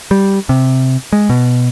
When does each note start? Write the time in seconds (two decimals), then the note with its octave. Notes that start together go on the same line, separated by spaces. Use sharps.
0.11 G3
0.49 C3
1.13 G#3
1.29 B2